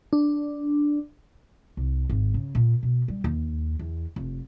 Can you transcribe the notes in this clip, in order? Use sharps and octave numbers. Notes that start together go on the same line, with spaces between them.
D4
C2
G#1
C#3
A#2
B2
G3
D#2
E2
F1